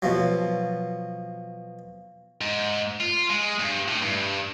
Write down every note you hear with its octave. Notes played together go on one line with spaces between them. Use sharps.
B2 F3 F#3
G#2
F4
G#3
G2
A2
G2